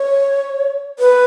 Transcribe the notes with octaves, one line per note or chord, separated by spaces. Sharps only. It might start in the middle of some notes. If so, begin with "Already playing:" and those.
Already playing: C#5
B4